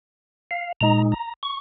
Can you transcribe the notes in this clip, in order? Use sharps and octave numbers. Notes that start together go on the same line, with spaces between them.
F5
A#2 G#3 D#4 A#5
A#5
C#6